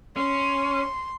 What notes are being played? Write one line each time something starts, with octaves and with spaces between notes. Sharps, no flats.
C#4 C6